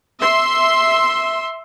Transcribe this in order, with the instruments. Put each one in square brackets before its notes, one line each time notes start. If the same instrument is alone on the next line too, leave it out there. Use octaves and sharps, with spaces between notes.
[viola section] E5 C6